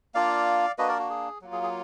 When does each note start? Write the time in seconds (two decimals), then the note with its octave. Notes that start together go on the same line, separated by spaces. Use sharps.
0.14 A#3 D4 F4 D5 F5
0.78 A#3 D4 F#4 B4 D#5
0.88 A#4 D5
0.99 F#4
1.10 G#4
1.41 F#3 A#3 F4
1.52 G#4
1.63 G#4